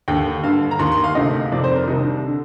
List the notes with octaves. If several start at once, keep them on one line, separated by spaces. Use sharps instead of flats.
D#2 D3 G5
G2 D3 F5
A#5
D#2 D#3 C6
C6
F5
D2 C3 D#3 D#5
F2 C3 D#3 D5
C5
A#4
C2 C3 D#3 D#4
D4
D3